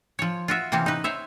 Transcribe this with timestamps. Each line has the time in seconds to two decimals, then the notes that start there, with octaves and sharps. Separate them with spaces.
0.19 F3 C#5
0.48 F4 F#4 E5
0.72 C3 E3 A#3 C4 C#4
0.86 D#4 B4
1.04 C5 C#5 E5